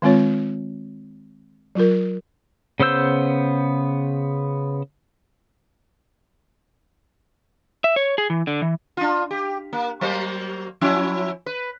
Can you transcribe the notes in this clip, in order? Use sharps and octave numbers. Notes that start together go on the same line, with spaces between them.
D#3 G#3 C4 F4 C#5
F#3 F4 A#4
C#3 B3 C5 E6 G6
E5
C#5
G#4
E3
D3
E3
D4 F4
G4
A#3
F#3 A#3 C5
F3 C#4 E4
B4